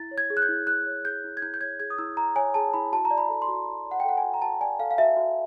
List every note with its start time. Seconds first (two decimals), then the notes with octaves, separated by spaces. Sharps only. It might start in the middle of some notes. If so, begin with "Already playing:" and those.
Already playing: E4 A6
0.11 C#5
0.18 G#6
0.30 G#4
0.37 F#6
0.42 G6
0.49 E4
0.67 E4 F#6
0.86 C#5
1.05 G#4 G6
1.24 E4
1.37 G#6
1.42 E4 G6
1.54 G6
1.61 C#5 G#6
1.80 G#4 G#6
1.90 D#6
1.98 E4 E6
2.17 E4 A#5
2.36 C#5 G#5
2.54 G#4 A5
2.73 E4 B5
2.93 F#4 A5
3.05 A#5
3.11 D5
3.18 B5
3.29 A4
3.42 C6
3.48 F#4
3.67 F#4
3.86 D5
3.91 F#5
4.00 G5
4.04 A4 F#5
4.17 G#5
4.23 F#4
4.34 A#5
4.42 F#4 A5
4.61 D5 G#5
4.79 A4 F5
4.91 F5
4.98 F#4 E5
5.17 F#4